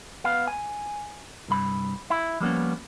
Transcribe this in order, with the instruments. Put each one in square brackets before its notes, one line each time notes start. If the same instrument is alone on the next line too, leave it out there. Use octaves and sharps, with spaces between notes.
[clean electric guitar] B3 F5
G#5
C2 G2 B5
E4
F3 G3 A#3 B3 C#4